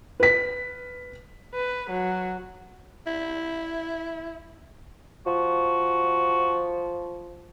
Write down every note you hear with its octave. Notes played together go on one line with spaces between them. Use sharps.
B4 B6
B4
F#3
E4
F3 F#4